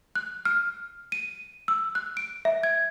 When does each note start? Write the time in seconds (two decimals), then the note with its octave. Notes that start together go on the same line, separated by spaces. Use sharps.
0.15 F#6
0.45 F6
1.12 D#7
1.68 E6
1.95 F#6
2.17 D7
2.45 E5
2.63 G#6